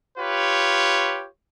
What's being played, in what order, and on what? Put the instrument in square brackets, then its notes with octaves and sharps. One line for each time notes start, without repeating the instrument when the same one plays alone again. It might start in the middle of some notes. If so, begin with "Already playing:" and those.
[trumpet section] F4 G4 B4 C#5